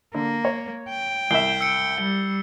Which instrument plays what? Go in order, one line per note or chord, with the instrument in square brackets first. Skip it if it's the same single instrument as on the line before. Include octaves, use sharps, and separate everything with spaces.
[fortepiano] D3 [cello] A#3
[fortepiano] C#5
[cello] G5
[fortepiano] C2 E5 [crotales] G6 C7 G7
[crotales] E6 C#7
[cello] G3